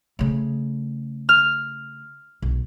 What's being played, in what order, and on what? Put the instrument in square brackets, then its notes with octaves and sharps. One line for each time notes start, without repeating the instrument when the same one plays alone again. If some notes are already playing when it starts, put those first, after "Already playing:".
[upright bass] C#3 A3
[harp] F6
[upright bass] B1